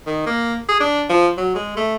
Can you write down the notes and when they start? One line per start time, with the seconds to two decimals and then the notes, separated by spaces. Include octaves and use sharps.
0.06 D#3
0.26 A#3
0.69 G#4
0.80 D4
1.09 F3
1.37 F#3
1.55 G#3
1.77 A3